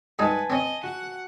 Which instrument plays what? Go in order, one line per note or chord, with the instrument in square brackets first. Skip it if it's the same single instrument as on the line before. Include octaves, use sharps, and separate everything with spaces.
[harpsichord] G#2 G3 D#4 [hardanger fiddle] B4 F#5 [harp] G#5 A5 G#6
[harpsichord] C4 C#4 [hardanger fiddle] D#5
[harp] F#4 [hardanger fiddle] F#5